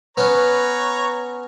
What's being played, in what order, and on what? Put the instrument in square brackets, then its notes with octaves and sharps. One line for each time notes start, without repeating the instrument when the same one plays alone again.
[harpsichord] B3 C#4 [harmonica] B4 C#5 A#5